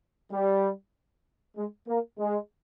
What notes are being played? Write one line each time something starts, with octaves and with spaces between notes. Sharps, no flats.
G3
G#3
A#3
G#3